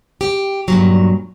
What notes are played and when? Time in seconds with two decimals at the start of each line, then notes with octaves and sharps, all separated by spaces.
0.21 G4
0.68 G2 A#2 F#3